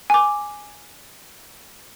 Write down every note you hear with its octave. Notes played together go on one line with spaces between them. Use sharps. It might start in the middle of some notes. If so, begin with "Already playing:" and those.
G#5 D6